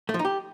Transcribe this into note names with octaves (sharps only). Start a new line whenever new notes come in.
A3
F3
D#4
G4